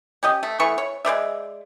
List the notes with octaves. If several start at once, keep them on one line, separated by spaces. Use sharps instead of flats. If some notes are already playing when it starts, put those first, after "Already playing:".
C#4 G4 D#5
A3
E3 A3 B3 C#6
C#5
G#3 C5 D5 E5